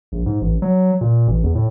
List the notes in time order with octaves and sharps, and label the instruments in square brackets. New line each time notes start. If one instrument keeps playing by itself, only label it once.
[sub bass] A#1
G#2
A1
F#3
A#2
A1
E2
A2